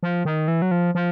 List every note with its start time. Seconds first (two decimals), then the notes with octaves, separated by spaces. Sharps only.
0.03 F3
0.25 D#3
0.48 E3
0.62 F#3
0.71 F3
0.95 F3